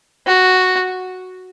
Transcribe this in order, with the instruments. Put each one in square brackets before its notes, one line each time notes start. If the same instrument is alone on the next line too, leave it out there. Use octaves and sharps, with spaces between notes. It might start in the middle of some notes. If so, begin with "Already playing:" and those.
[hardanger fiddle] F#4